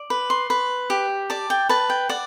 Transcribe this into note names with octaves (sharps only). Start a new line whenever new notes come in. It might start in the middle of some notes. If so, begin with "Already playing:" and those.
Already playing: D5
B4
C6
B4
G4
D5 A5
G5
B4 A5
G5
D5 F#5